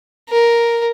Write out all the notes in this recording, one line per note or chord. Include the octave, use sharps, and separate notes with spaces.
A#4